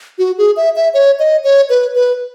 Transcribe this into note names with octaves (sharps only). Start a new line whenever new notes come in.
F#4
G#4
E5
E5
C#5
D#5
C#5
B4
B4